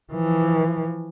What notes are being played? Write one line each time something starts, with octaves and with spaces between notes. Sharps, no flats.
E3 F3